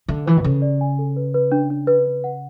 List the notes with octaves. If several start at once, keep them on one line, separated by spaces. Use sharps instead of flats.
D3 E5
E3 B4
B2
C#3 A4
D5
G#5
A4
B4
B4
D4
D4
B4
B4
F#5